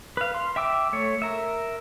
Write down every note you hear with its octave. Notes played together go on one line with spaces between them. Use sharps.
B4 F5
C6
E5 G5 D6 E6
A3 C#5
A#4 E5